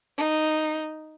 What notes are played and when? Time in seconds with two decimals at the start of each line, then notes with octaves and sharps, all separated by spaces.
0.17 D#4